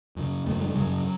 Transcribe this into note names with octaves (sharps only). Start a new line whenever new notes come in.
F#2 C#3
F#2 C#3 A3
G3
F#2 C#3 F#3